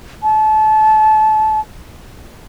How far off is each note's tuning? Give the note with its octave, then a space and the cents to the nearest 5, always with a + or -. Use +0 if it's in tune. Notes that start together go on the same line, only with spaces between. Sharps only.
A5 -30